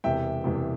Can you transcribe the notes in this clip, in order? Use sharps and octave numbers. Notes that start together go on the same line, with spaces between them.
E1 E2 C3 E5 G5
E1 E2 C3